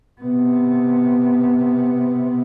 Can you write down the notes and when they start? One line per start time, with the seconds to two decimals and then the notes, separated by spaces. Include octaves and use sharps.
0.21 C3 B3